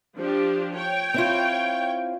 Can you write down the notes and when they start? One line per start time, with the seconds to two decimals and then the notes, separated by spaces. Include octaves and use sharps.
0.16 F3 D4 G4
0.75 C#5 G5
1.14 C4 E4 F4